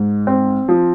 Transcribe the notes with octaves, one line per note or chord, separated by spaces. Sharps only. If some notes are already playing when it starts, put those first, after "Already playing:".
Already playing: G#2
C4
F3